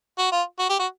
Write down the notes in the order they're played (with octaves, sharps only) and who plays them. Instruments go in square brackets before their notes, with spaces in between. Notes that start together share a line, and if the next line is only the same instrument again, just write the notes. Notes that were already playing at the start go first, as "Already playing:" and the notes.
[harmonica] F#4
F4
F#4
G4
F#4